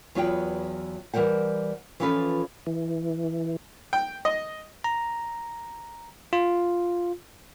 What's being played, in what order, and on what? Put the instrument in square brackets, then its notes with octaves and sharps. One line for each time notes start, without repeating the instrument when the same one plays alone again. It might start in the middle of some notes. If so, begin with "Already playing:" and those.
[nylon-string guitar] E2 F#3 B3 F4 F#4 G5
E3 G3 A#4 C5 F#5
E3 F3 C#4 F4 A4 B4
[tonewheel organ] E3
[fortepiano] G5
D#5
[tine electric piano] A#5
F4